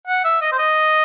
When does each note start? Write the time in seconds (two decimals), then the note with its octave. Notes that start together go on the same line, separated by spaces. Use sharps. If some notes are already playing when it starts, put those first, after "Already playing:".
0.07 F#5
0.24 E5
0.41 D#5
0.52 C5
0.58 D#5